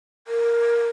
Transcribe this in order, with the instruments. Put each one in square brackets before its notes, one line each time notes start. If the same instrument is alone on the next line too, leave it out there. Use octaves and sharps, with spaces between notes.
[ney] A#4